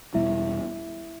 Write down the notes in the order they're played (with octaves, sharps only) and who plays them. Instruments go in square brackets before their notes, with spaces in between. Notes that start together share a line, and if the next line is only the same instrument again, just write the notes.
[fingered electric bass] E2 B2 G3 B3 [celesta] E4 E5